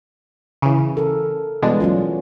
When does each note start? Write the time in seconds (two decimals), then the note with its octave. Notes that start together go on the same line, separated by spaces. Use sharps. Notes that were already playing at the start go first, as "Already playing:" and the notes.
0.62 C#3 E3
0.97 A4 A#4
1.62 B2 E3 G3 G#3 D4
1.80 F#3 C#4 F4